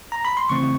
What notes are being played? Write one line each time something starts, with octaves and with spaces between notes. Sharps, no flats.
A#5
B5
C6
C#3 E3 A3 C4 C#6